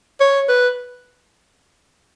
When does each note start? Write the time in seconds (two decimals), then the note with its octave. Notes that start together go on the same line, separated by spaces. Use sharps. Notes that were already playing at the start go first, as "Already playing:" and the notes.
0.20 C#5
0.48 B4